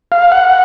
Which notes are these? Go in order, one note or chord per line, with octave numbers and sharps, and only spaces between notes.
F5
F#5